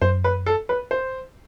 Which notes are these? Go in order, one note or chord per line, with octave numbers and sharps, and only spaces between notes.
F#2 C5
B4
A4
B4
C5